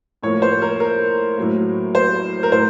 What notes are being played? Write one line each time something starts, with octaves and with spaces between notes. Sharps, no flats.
A2 F3 A#3 C#5
C5
A#4
A#4
A2 F#3 A#3
C5
A#4
A2 C5